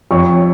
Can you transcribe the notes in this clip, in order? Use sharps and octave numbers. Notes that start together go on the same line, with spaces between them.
F2 C#5 C#6